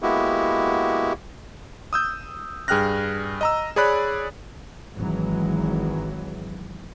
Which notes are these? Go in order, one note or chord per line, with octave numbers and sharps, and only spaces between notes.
G#3 A#3 B3 E4 F#4 G4
D#6 E6 G6
G2 G#4 G5 F6 F#6 A#6
D#5 A#5 E6
G#4 C#5 D5 B5 F#6
G#1 E3 F#3 G#3